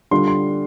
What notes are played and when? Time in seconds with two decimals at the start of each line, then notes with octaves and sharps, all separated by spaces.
0.11 D3 G3 D4 F4 C6
0.28 C6